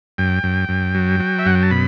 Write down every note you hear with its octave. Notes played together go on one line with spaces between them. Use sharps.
F#2 G5
F#2
F#2
F#3
F#3
E5
F#2 F#5
G5
A5
B2 B5